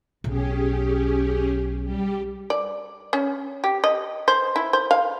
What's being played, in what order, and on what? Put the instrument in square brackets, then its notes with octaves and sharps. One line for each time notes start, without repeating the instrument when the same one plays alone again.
[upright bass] B1 [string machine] C#4 G4 G#4
[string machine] G3 G4
[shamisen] D5
C#4
G4
D#5
C5
E4
C5
F5